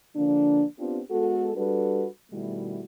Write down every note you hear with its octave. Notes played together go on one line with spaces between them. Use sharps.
D3 F3 A#3 D4
B3 C4 D4 F4 G4
G#3 B3 F#4 A4
G3 D4 F#4 A4 B4
B2 D#3 G3 A3 E4 F#4